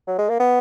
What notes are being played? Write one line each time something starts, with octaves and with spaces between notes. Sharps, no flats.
F#3
G#3
A#3
B3